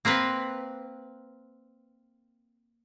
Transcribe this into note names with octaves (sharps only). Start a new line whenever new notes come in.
A#3 C4 A#4 B4